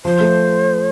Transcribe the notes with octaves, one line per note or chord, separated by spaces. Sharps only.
F3 C5
A3